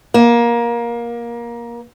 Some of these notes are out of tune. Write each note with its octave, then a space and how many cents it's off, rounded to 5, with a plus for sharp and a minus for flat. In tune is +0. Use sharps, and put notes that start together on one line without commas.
A#3 +20